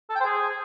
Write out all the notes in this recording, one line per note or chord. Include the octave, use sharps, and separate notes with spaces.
A4
G5
C5
G#4